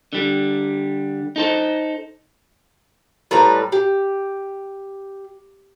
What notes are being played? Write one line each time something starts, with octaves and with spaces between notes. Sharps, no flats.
D3 G3
D#4 A4 C5
A2 G3 B4 A#5
G4